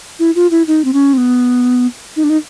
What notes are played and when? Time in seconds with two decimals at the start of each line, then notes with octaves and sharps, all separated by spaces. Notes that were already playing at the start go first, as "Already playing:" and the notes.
0.19 E4
0.35 F4
0.51 E4
0.67 D#4
0.85 C4
0.93 C#4
1.13 C4
1.18 B3
2.16 D#4
2.24 D4
2.30 D#4